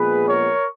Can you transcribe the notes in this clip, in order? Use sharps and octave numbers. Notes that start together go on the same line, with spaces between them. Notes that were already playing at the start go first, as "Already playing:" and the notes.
Already playing: A#1 A#2 G#3 B3 G#4 B4
A#4 C#5